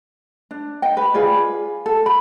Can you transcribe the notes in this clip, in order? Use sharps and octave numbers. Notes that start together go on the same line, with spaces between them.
D4
D#5 G5
B4
F4 G#4 B4 D5
A4
B5